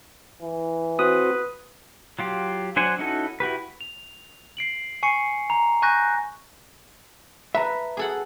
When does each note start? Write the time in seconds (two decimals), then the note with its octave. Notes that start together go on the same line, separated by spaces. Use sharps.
0.42 E3
0.99 C4 F#4 B4 D#6
2.19 F#3 F4 G4
2.76 F#3 D4 C5 F#5 G#5
2.99 C#4 D#4 E4 F#4 A4
3.40 E4 F#4 G4 B4
3.81 F7
4.57 C7 D7 F#7
5.03 G#5 C#6 C7 C#7
5.50 A#5
5.82 G#5 C#6 F#6 G6 A#6
7.55 B4 E5 A5 A#5
7.97 G#4 A4 F#5